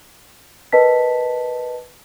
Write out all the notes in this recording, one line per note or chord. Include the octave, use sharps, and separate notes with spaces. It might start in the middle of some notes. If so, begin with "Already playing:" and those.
A#4 B4 D#5 A5 B6